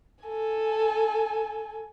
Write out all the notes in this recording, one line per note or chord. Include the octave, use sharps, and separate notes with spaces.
A4 G#5